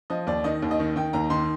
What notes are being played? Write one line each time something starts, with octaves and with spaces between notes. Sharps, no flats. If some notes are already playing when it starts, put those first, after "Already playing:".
F3 D#5
D#2 D5
D#3 D#5
D#2
D#5
D#3
D#3 G5
D#2 A#5
D#3 C6